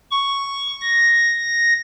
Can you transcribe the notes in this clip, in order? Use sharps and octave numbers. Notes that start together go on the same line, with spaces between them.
C#6
A#6